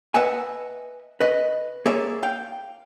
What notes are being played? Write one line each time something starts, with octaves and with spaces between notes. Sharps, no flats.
B4 D#5 E5 F#5 G#5
B4 D#5
A#3 G#4 C#5 D5 E5
F5 G5